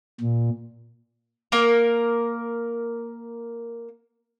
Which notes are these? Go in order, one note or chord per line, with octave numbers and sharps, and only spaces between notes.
A#2
A#3 A#4